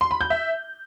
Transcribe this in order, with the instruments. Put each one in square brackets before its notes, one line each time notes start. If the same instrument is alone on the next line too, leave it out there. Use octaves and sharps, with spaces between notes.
[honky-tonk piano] C6
B5
G6
E5